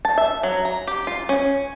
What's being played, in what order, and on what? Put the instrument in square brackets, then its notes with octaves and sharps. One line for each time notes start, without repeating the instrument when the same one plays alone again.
[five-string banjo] A5
E5
F#3
A#5
G4
F4
C#4